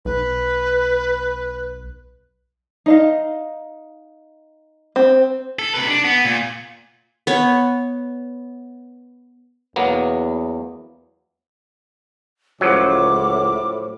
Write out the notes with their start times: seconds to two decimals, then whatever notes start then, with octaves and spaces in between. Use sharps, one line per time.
0.05 B1 B4
2.86 D#4 D#5 F5
4.96 C4
5.59 A4
5.74 C3 B4
5.88 D4
6.04 B3
6.24 A#2
7.27 B3 C#5
9.76 E2 F#3 A#3 B3
12.61 C#2 A2 F3 F#3 D6